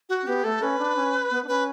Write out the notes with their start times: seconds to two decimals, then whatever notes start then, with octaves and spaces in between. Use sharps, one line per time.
0.09 F#4
0.22 C#4
0.27 B3 G4
0.44 A3 A4
0.62 C#4 B4
0.79 D4
0.96 C#4
1.31 B3
1.44 D4
1.48 C#4 B4